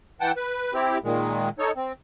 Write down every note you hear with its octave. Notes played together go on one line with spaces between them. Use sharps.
E3 F#5 G5 A5
B4
C4 E4 G4
A#2 D#3 G#3
D#4 A4 C#5
C4